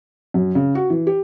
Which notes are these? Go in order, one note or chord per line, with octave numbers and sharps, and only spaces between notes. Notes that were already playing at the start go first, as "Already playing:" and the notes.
F#2
C#3
F#4
E3
G4